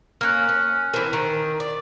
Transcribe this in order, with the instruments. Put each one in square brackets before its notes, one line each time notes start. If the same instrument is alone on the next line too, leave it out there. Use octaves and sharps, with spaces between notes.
[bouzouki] A#3 C#4 [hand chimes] F6 F#6
[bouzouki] C#4
[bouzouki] E3 C4 [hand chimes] A#4
[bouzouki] D#3
D5